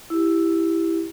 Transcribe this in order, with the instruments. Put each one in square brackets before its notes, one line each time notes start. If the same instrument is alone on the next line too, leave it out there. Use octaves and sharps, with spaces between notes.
[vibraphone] E4 G4